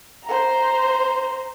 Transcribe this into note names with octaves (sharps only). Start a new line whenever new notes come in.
C5 A#5